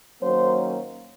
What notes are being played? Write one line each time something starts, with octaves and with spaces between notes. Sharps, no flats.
D#3 F#3 A#3 C#4 C5